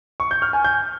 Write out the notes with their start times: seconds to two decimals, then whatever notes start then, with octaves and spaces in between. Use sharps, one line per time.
0.20 C#6
0.31 G6
0.42 F6
0.53 G#5
0.64 G6